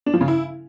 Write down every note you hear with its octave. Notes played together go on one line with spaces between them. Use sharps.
D4
F3
C#3
E4